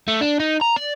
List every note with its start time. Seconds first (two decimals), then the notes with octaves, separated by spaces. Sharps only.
0.08 A3
0.21 D4
0.40 D#4
0.61 A#5
0.76 D5